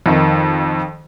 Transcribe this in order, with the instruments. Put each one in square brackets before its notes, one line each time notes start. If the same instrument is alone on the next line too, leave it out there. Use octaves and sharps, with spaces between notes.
[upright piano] F2 D#3